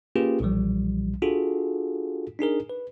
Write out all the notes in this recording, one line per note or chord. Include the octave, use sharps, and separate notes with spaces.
A#3 C#4 F4 G4 G#4 B4
B1 A#2 E3 F3 G3
D4 F4 F#4 G#4 A4
D4 D#4 G#4 A#4
B4